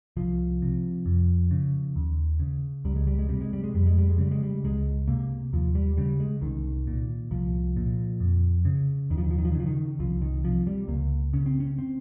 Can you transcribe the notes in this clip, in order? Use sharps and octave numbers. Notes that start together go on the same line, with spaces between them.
C2 F3
C3
F2
C#3
D#2
C#3
C#2 G3
G#3
G3
G#3
C3 G3
G#3
G3
G#3
F2 G3
G#3
G3
G#3
C#3 G3
G#3
G3
C#2 G#3
C3 A#3
D#2 F3
G3
C#3 G3
G#3
C2 D#3
A#2
C2 F3
A#2
F2
C#3
D#2 D#3
F3
D#3
F3
D#3
F3
D#3
C#3 F3
D#3
C2 F3
D#3
C3 F3
G3
C#2 A#3
C#3 C#4
C4
C#4
C4